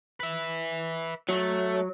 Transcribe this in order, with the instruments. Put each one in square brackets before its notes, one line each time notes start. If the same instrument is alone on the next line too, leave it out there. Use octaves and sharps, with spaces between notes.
[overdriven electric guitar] B4 E5
[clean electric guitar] F#3 [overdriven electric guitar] A3